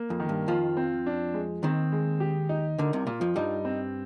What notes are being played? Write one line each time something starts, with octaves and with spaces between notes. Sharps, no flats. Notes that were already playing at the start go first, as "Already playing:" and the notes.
Already playing: A#3
F2
D#3
G2
F2 F3 F4
C4
D4
G#3
D#2 D#3 C4
G#3
G4
D#4
D2 D3 A#4
C2 C3
A#2 F4
F2 F3
G2 G3 D#4
C4